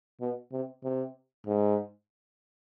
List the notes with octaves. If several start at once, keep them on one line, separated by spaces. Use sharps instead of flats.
B2
C3
C3
G#2